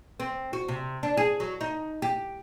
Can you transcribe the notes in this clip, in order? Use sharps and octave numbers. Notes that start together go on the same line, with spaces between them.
C4
F#4
C3
D4
G#4
F#3
D#4
G4